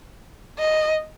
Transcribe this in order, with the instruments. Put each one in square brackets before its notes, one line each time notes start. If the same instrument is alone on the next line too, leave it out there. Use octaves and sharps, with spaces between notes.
[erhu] D#5